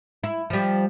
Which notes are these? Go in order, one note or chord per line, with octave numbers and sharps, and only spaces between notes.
E4
F3 G3